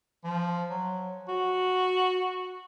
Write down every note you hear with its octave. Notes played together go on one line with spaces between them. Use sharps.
F3
F#3
F#4